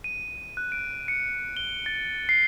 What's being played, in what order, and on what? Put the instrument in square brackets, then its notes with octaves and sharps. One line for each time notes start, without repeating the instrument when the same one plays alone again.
[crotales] D#7
F#6
D7
C#7
G7
A6
C7